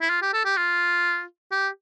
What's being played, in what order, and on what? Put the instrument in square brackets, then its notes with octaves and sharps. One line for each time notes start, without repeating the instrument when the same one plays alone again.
[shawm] E4
F4
G4
A4
G4
F4
G4